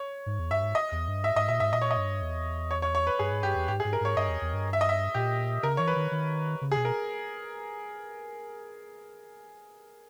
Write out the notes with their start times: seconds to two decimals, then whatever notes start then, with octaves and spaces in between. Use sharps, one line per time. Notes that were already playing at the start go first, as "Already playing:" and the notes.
Already playing: C#5
0.26 G#2
0.39 E2
0.51 G2 E5
0.63 G#2
0.75 D#5
0.92 E2
1.08 G2
1.24 G#2 E5
1.36 G#2 D#5
1.48 A#2 E5
1.60 G#2 E5
1.73 A#2 D#5
1.82 C#5
1.91 D#5
1.97 G2
2.22 E2
2.71 C#5
2.82 C#5
2.95 C#5
3.07 B4
3.19 G2 G#4
3.32 G#2
3.43 G2 G4
3.56 E2
3.68 G#2 G4
3.80 G#4
3.85 G#2
3.93 A#4
4.01 G#2 C#5
4.17 G2 D#5
4.29 E2
4.41 E2
4.54 G2
4.73 E5
4.81 D#5
4.89 E5
5.14 A#2 G4
5.63 C#3 A#4
5.77 E3 C#5
5.87 B4
5.96 D#3
6.12 D#3
6.61 C#3
6.72 G#4
6.77 B2
6.85 A#4